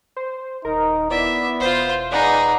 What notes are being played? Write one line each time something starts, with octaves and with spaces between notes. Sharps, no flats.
C5
D#1 D#4 A#4
B3 E4 D5 E5
E1 F4 C5 C6
G#3 D#4 G#4 B4 D5 F#5